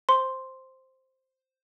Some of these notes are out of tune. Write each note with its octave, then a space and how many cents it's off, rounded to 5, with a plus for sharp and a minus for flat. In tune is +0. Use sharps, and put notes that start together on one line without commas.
C5 +0 C6 +0